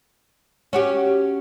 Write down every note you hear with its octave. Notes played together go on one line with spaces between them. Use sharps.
C#4 F#4 G4